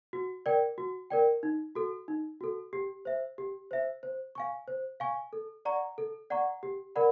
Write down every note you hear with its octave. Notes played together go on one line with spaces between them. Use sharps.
F#4
A#4 D5 G5
F#4
A#4 D5 G5
D#4
F#4 A4
D#4
F#4 A4
G4
C5 E5
G4
C5 E5
C5
F5 G#5 C#6
C5
F5 G#5 C#6
A4
D5 F#5 A#5 C#6
A4
D5 F#5 A#5 C#6
G4
A#4 D5 F#5 B5